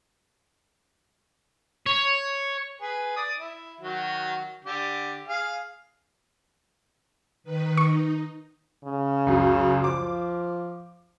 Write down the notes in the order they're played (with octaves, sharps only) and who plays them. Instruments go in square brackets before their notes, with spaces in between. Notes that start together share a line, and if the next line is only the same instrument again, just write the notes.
[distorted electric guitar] C#5
[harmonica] G#4 B4
D5 D#6
E4
D#3 F#3 F#4
D3 G4
G#4 F5
[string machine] D#3 B4
[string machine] D#4 [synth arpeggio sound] C#6
[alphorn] C#3
[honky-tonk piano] C#2 F#2
[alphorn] F3 [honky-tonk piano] D6